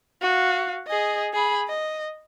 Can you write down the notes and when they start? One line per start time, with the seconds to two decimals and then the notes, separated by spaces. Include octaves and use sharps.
0.22 F#4 F5
0.87 G#4 D#5
1.34 G#4 B5
1.68 D#5